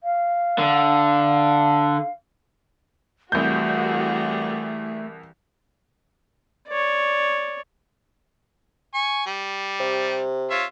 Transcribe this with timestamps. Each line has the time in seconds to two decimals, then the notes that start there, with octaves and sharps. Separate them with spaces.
0.03 F5
0.58 D3
3.32 C2 E3 G3 A3 F#4 G#4 G6
6.68 C#5 D5
8.94 G#5 C#6
9.26 G3
9.80 C3
10.50 F4 C#5 E5